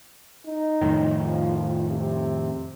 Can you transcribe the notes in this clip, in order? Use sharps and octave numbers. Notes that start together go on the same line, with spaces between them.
D#4
F2 A2 D#3
F3
F3
C3